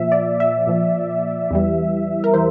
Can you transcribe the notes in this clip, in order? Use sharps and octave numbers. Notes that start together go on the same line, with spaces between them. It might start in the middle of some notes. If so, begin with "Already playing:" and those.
Already playing: A#2 F3 E5
D5
E5
A#2 F3
E2 E3 G3
A#4
E3 C5